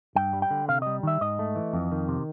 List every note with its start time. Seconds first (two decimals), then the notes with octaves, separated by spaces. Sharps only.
0.16 G2 G5
0.33 G3
0.42 G5
0.51 D3
0.69 C3 F5
0.82 G3 D#5
1.03 D#3 E5
1.21 G#2 D#5
1.39 A3
1.55 E3
1.73 F2
1.92 D#3
2.08 C3